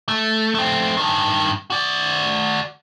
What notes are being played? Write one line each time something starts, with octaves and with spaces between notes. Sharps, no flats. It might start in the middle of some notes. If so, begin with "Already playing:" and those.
A3
A3 C4
G2 D#3
F#4 D5